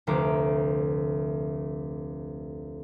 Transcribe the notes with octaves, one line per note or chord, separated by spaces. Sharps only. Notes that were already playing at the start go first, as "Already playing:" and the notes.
F1 D2 C5 A#5 D6